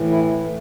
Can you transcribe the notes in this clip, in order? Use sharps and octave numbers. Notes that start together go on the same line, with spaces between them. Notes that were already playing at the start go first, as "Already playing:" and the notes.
Already playing: A2 E3
E4
A3